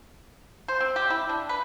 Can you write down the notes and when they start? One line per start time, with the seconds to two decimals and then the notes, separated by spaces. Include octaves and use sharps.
0.68 C5
0.80 C4
0.96 G4
1.10 E4
1.29 D4
1.49 B4